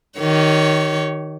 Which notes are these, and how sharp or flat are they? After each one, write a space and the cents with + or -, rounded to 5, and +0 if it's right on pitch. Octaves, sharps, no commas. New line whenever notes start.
D#3 +0 G4 -35 C#5 +10